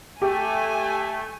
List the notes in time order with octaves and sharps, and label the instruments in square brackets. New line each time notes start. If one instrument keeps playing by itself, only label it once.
[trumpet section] A3 [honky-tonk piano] G4 [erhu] G#5